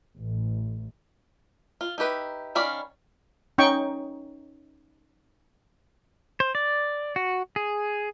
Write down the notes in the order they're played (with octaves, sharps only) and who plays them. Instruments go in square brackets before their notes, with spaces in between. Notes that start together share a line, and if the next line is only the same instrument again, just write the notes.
[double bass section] A1
[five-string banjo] F4
D#4 E4 G4 B4
D#3 C#4 D5 F5 B5
[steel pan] C#4 D#4 G5 C#6
[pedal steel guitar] C5
D5
F#4
G#4